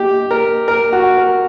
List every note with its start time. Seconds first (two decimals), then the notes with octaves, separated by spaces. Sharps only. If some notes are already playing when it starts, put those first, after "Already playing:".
Already playing: G4
0.31 A#4
0.68 A#4
0.93 F#4
1.17 A#4